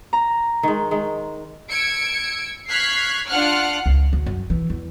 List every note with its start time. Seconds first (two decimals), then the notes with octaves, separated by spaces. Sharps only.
0.13 A#5
0.63 D#3 G#3
0.91 D#3 G#3
1.70 E6 G#6 C#7 D7
2.67 C#6 F6 F#6 G#6 B6 C7
3.28 D4 F4 F#5 F6 F#6
3.86 C#2
4.13 D2
4.26 F#2
4.50 E3
4.70 E2